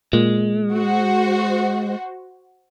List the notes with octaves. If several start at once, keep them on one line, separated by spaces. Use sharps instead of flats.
A#2 G#3
F#4 C5